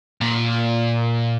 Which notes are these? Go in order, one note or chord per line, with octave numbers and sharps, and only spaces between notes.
A#2